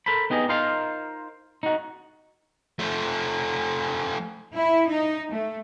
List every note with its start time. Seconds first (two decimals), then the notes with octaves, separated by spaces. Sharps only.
0.06 A4 A#4 C5 B5
0.30 B3 D#4 G4 G#4 D#5
0.49 D#4 F4 A#4 C5 F5
1.63 D#4 F#4
2.79 F3 A3
4.54 E4
4.88 D#4
5.32 A3